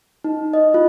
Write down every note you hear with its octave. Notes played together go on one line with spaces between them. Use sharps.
D#4
D#5
F4